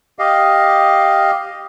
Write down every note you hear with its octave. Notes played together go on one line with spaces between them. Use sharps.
G4 D#5 F5